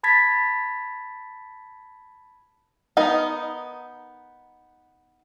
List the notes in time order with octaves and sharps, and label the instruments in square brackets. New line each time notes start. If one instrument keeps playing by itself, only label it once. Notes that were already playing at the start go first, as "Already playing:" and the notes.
[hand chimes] A5 B5 G#6 A6 B6
[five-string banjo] B3 D#4 A#4